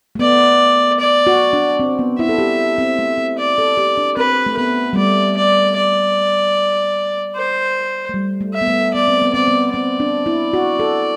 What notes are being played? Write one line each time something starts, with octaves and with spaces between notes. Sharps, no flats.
A3
B3 D5
D5
F#4
D4
C4
B3
E4 E5
A4
G4
C4
A3
C4
D5
A4
G4
D4
C4 B4
A3
B3 B4
G3
A3 D5
D5
D5
C5
A3
G3
A3
E5
B3
A3
B3 D5
C4
B3
C4 D5
B3
C4 D5
D4
E4
F#4
A4